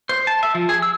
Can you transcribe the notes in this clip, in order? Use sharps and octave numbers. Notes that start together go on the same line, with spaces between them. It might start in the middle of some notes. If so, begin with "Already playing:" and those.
C5
A5
E5
F3
G#4
E6